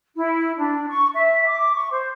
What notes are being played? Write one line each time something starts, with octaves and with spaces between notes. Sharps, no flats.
E4
D4
C#6
E5
D6
C#6
C5